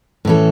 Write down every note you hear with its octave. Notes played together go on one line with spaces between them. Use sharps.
A2 E3 C#4 A4